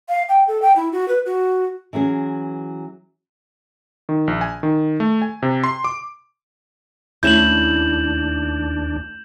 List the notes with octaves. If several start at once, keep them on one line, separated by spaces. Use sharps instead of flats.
F5
G5
A4
G5
E4
F#4
B4
F#4
E3 F#3 C#4 G#4
D#3
A#1
G#5
D#3
A3
G#5
C3
C6
D6
D#2 A3 C#4 D4 E4 G6 E7 F#7